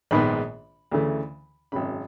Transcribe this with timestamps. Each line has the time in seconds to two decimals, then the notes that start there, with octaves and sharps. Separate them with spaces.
0.11 A#1 G#2 D#3 G#3 B3 B5
0.91 D2 C#3 E3 A3
1.72 G#1 F#2 C#3 B5